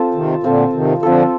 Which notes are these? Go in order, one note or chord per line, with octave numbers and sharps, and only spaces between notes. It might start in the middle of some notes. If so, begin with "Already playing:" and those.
Already playing: C4 F4 A4
C3 D#3
A#2 D3 C4 F4 A4
C3 D#3
D#3
D3 F3 C4 F4 A4